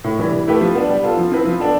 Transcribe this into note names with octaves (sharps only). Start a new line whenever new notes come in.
A2
E3 G3
E3
A3 E4 G4 B4
F3
B3 D4
G3
B3 F4 A4
F3
C4 E4 B4
F3
B3 D4 A4